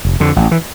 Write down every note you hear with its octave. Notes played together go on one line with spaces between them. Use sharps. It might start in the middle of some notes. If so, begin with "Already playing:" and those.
F1
F2 D3
A1
E3